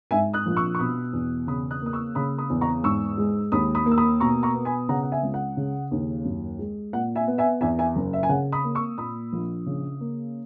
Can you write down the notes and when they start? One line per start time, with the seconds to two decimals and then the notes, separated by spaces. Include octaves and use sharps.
0.11 G#2 E5 G#5
0.33 D#6 F#6
0.46 A#1
0.56 C#6 E6
0.75 C#6
0.79 B2 B5 D#6
1.13 E2
1.47 C#3 B5 D#6
1.71 D#6 F#6
1.82 A#3 D#6
1.93 C#6 E6
2.15 C#3 B5 D#6
2.38 B5 D#6
2.50 E2
2.61 A#5 C#6
2.83 G#2 C#6 E6
3.18 G#3
3.52 D#2 B5 D#6
3.75 B5 D#6
3.86 A#3
3.91 E6
3.97 B5 D#6
4.20 B2 A#5 C#6
4.43 A#5 C#6
4.54 B3
4.65 G#5 B5
4.89 C#3 F#5 A#5
5.03 F#5
5.12 E5 G#5
5.23 C#2
5.34 F#5
5.57 C#3
5.91 D#2
6.25 F#2
6.59 G#3
6.93 A#2 F#5
7.15 E5 G#5
7.27 B3
7.38 E5 G#5
7.61 E2 E5 G#5
7.78 E5 G#5
7.96 F#1
8.13 E5
8.23 G#5
8.29 C#3 F#5
8.52 B5 D#6
8.64 A#3
8.75 C#6 E6
8.97 A#2 B5 D#6
9.33 A#1
9.66 C#3
10.01 A#3